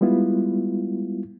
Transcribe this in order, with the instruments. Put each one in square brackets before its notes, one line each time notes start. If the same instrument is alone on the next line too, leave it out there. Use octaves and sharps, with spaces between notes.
[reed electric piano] G3 G#3 B3 E4 F4